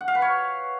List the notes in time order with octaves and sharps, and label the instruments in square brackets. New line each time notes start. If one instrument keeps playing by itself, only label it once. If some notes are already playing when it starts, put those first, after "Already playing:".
[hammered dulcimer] F#5
F5
B4
C#5